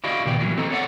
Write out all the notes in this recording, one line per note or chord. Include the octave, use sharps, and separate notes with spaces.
E4 F#4 G4 D5 D#5 F5
C#2 A#2 D#3 B3 D5 G5
E3 F#3 G3 A#3 E4
C4 A4 D#5 A#5
A4 C#5 D5 E5 F#5